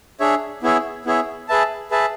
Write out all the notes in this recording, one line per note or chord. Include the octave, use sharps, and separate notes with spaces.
D4 G#4 C#5 E5
B3 E4 G#4 C#5 E5
B3 E4 G#4 C#5 E5
G#4 B4 E5 A5
G#4 B4 E5 A5